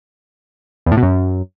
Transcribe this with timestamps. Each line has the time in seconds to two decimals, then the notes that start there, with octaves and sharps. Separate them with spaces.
0.86 E2
0.92 A2
0.97 B2
1.02 F#2